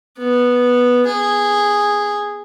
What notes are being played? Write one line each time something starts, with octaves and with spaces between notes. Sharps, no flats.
B3
G#4